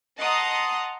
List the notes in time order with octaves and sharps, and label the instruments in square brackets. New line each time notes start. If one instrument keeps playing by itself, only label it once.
[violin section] D#5 F#5 A5 A#5 C6 D#6